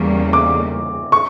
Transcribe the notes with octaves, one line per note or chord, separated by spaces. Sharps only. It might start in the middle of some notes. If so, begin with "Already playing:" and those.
Already playing: E2 C#3 E3 G3 A#3
D6
C#6